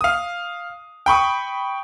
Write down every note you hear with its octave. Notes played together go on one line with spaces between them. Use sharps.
F5 D#6
G5 B5 C#6 D#6